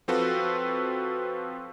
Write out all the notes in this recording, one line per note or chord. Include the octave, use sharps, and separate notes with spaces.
F3 C4 F4 F#4 A4 B4